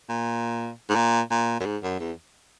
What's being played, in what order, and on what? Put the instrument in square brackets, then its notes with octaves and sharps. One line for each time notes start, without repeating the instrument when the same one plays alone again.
[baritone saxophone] A#2
G#2
A#2
A#2
F#2
G#2
F#2
E2